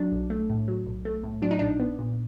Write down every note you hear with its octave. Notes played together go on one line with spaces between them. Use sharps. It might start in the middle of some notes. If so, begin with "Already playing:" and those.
Already playing: F#3 D4
B1
A3
A2
F#3
B1
A3
A2
F#3 D4
D#4
A#1 D4
B3
A#2